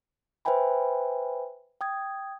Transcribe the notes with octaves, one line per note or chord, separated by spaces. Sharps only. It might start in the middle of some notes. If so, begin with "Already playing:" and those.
B4 C5 E5 G5 G#5 B5
G5 D#6 G#6